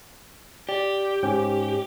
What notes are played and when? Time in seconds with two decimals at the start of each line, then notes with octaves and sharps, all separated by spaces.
0.69 G4 D5
1.23 G#2 C#4 G5